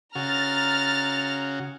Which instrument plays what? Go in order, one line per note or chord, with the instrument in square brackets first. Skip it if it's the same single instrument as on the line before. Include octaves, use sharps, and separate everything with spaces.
[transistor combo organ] C#3 F#4 [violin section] A#5 F6 A6